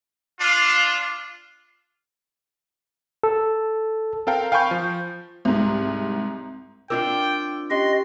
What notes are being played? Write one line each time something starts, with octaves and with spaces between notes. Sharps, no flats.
D4 F4
A4
C4 A4 A#4 F5 G5
F5 G5 G#5 B5 C#6 G6
F3
C2 G#2
C4 D4 F4 A#4 G5 D6 E6
C#4 G4 D#5 C6